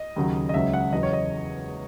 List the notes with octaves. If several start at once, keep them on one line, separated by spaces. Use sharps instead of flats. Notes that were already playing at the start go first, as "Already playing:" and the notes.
Already playing: D#5
D#2 C#3 F#3
D#5
C#2 C#3 F#3 E5
F#5
E2 C#3 F#3 D#5
C#5
D#5